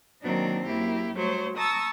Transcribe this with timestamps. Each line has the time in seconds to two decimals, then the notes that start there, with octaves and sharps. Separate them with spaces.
0.24 D#3 F#3 A#3 C4 D4 D#4
0.66 F#2 A#3 E4 G4
1.14 F#3 G3 A3 C5 C#5
1.58 A5 A#5 C#6 D#6 E6